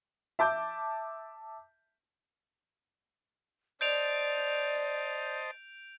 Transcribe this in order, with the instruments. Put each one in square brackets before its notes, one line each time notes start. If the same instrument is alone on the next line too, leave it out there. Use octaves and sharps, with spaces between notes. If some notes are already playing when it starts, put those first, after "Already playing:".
[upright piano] E5 A5 D6 G6
[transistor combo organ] C5 D#5 A5 [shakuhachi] D5 [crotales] G6 D7 F7